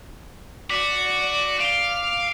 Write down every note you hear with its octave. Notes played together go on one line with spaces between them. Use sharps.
F#4 D5 D6 B6
F5 D7 G7